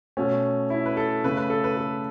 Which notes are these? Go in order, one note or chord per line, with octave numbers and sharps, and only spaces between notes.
B2 A3 C#4
E4
B4
A4
C#3 A3 B4
B4
A4
B4
A4